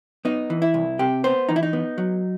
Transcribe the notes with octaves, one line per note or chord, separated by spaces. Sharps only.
B3 D#4
E3
E4
C2
C3 G4
B3 C5
E3 D#4
E4
D#4
B3
F#3